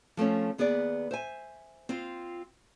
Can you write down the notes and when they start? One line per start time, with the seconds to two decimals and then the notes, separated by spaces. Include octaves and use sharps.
0.17 F3 A3 C4 C#4
0.58 D#2 B3 G#4 B4 D5
1.11 C5 E5 G#5
1.89 C4 F4